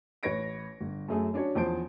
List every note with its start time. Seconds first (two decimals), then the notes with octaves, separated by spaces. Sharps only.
0.23 A1 B4 C#5 A#6 D7
0.80 G1
1.08 F#2 A3 G#4
1.34 C#4 D4 F#4 C#5
1.55 E2 F3 C5 A5 D7